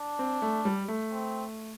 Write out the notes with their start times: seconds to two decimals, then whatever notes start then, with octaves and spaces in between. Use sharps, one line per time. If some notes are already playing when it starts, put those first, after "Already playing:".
Already playing: D4
0.19 C4
0.42 A3
0.65 G3
0.88 A3
1.12 C4